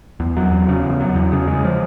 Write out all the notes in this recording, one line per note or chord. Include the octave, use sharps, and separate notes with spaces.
E2
F#3
E2
C#3
E2
F#3
E2
C#3
G#3
F3